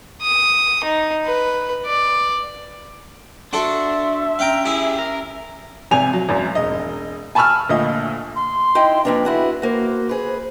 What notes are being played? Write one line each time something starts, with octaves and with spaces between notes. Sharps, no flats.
D#6
D#4
B4
D5
D4 F#4 A4 E5 C6
C#4 F5 G5 A#5
E4 G4 G#4
A#4
G#1 C3 G#5 F7
F#3
G#1 F#2
E1 D#5
G#5 A5 B5 C#6 E6 F6
D2 A#2 D#5
C6
D#4 E4 G5
F2 A#3 D4 B4
E4 F#4 G#4
A#3 F#4 C5
G#4 B4